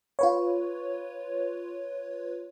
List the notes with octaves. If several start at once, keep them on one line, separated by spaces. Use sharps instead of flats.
F4 B4 C#5